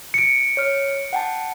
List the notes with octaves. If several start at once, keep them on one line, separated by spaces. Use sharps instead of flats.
C#7 D7
C#5 F6
F#5 G5 A5